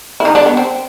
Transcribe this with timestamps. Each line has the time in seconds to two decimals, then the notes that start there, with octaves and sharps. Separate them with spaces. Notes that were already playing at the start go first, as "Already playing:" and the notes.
0.20 E4
0.25 D#3 D#4
0.35 D3 D4
0.46 B3
0.57 C4